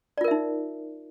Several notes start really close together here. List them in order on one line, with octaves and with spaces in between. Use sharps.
D5 F4 A#4 E5 D#4